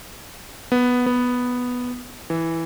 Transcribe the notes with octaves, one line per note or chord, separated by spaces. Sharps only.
B3
B3
E3